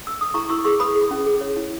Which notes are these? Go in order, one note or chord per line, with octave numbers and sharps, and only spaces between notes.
E6
D#6
E4 A#5 C#6
E4 C#6 E6
G#4 C#6 E6
B4 B5 D#6
G#4
C#4
G#4
C#5
E4